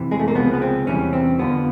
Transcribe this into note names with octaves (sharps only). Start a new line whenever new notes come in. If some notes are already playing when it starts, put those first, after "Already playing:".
Already playing: F2 C3 E3
G#3
A3
A#3
C#2 C3 F3 G#3 B3
B3
C4
E2 C3 E3 G3 C#4
C4
F2 D3 F3 B3